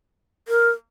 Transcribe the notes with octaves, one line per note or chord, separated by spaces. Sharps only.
A#4